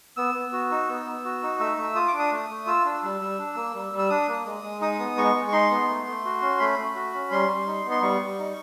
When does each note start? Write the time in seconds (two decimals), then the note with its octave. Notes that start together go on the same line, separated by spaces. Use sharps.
0.17 B3 E6
0.34 B3
0.52 F#4
0.71 D#4
0.88 B3
1.06 B3
1.25 F#4
1.43 D#4
1.60 A3 E6
1.77 A3
1.95 F4 D#6
2.07 D6
2.13 D4
2.19 D#6
2.32 A3
2.50 A3
2.66 F4 E6
2.85 D4
3.03 G3
3.21 G3
3.39 D4
3.56 A#3
3.75 G3
3.93 G3
3.98 E6
4.10 D4 D#6
4.28 A#3
4.45 G#3
4.63 G#3
4.81 D#4 D#6
4.99 B3
5.17 G#3 C#6
5.35 G#3
5.48 C#6
5.53 D#4 C6
5.71 B3
5.89 A3
6.07 A3
6.25 F#4
6.42 C#4
6.59 A3 B5
6.78 A3
6.95 F#4
7.14 C#4
7.31 G3 C6
7.49 G3
7.67 D#4
7.86 B3
7.91 C6
8.02 G3 C#6
8.20 G3
8.38 D#4